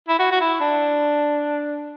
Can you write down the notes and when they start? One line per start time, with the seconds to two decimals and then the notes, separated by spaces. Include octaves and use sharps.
0.08 E4
0.19 F#4
0.32 F#4
0.41 E4
0.61 D4